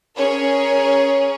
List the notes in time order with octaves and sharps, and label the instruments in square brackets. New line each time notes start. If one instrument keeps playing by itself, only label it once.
[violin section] C#4 G#4 A#4 C#5